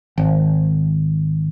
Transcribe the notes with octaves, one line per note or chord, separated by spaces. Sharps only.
G#1